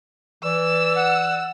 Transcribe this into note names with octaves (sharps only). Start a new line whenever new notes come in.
E3 D5 E6
F#5